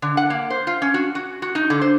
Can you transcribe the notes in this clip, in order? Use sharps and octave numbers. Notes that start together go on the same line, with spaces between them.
D3
F#5
A#3
C5
F4
C#4
F#4
F#4
F#4
D#4
D3
C5